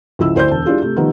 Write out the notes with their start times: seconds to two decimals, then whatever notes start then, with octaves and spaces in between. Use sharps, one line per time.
0.19 C#2 F3 E4 E6
0.35 D2 E4 C5 D5 C6 G6
0.51 E1 A5
0.66 G3 D4 E4 F4 G#4
0.82 C3 A3
0.96 D#3 F3 G3 B3 D#4